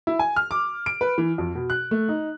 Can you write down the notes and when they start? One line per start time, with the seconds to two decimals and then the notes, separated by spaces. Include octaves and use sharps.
0.07 E4
0.19 G#5
0.36 F6
0.51 D6
0.86 D7
1.01 B4
1.18 E3
1.38 F2
1.55 B2
1.70 F#6
1.91 A3
2.09 D#4